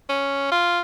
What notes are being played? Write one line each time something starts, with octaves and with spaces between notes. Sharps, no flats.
C#4
F4